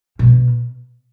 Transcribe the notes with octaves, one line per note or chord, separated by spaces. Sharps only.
B2